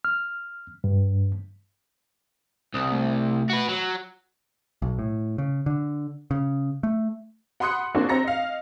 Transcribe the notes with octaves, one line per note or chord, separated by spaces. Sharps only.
F6
G2
C2 D#6
A3
F#4 B4
F#3
B1
A2
C#3
D3
C#3
A3
F#5 B5 C6 D#6 F#6 C#7
A#3 C4 D4 F4 F#4 G#4
C4 A#5 A#6 C#7
D#5 F5